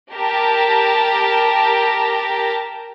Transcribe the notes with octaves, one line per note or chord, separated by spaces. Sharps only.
G4 A#4 A5 A#5